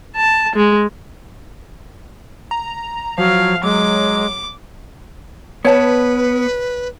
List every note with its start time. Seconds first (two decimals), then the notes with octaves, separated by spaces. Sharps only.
0.16 A5
0.56 G#3
2.51 A#5
3.18 F3 F#3 F5
3.63 F#3 G#3 D6
5.65 B3 B4 C#5 A5